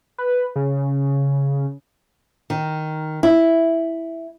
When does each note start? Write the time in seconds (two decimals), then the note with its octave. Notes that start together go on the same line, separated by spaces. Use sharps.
0.18 B4
0.56 C#3
2.50 D#3
3.23 E4